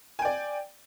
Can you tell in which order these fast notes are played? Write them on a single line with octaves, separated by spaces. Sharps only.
G#5 G5 D5